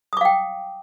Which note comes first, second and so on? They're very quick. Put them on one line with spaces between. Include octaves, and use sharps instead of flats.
D#6 D6 F5 G5